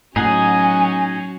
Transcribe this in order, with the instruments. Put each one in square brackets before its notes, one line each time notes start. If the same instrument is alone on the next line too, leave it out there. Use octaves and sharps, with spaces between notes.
[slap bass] A2 [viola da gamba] F#3 C#4 F#4 [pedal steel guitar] D#4 G#4 F#5 [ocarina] G#5